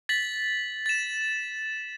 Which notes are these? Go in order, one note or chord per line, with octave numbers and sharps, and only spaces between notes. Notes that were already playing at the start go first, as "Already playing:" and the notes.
A6 B6 F#7
A6 E7